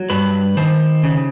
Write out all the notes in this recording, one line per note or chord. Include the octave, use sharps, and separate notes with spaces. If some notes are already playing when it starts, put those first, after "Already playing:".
Already playing: F#3
G2 B4
D#3 C5
C#3